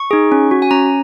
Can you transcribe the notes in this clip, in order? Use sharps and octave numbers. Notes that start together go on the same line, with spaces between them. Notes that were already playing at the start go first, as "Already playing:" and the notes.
Already playing: C#6
D#4 G#4
C#4
F#4
G#5
C#4 A#5